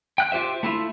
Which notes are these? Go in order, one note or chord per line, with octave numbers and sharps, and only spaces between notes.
G5 F#6
F4 G4 C5 E5
A3 E4 F4